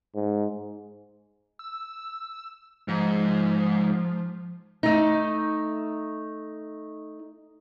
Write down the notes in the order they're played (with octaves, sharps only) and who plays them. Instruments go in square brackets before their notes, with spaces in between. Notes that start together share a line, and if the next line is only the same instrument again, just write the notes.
[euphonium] G#2
[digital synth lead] E6
[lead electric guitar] G#2 [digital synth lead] F3
[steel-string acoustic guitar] A3 D#4